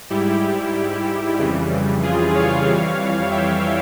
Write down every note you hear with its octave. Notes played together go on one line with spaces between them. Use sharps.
G#2 G3 E4 G4
F2 C#3 E3 G3
F4 G#4
C#5 F5
F2 E3 G3
E5 G5